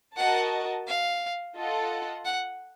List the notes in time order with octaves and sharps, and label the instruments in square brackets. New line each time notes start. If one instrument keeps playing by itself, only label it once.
[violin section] F#4 A#4 D#5 A5 [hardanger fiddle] F#5
[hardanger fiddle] F5
[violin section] F4 A4 D#5 F#5
[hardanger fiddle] F#5